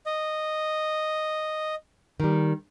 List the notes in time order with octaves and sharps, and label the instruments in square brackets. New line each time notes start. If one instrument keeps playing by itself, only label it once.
[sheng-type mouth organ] D#5
[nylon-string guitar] D#3 G3